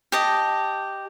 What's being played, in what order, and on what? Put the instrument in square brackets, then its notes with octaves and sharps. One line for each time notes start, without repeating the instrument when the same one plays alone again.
[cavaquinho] G4 D#5 A5